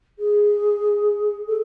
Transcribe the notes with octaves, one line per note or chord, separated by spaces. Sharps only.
G#4
A4